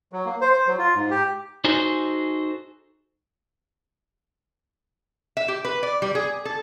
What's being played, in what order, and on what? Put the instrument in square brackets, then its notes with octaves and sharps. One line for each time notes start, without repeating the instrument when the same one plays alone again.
[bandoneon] F#3
A#3
C5
C5
F#3
F4
G#2
G4
[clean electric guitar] D#4 F#4 G#4 A4 C5
[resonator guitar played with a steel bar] E5
G4
B4
D5
G3
G#4
A4